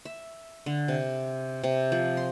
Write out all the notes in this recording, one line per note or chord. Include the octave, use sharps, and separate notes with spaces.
E5
D3
C3
C3
F3
C6